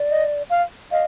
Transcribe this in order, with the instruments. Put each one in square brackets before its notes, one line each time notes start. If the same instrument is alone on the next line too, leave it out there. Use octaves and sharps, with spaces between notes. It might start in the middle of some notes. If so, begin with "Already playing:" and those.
Already playing: [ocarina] D5
[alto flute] D#5
F5
[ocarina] D#5 [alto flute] F5